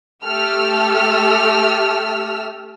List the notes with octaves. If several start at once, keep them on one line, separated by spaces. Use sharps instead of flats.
A3 G4 A4 E6 F6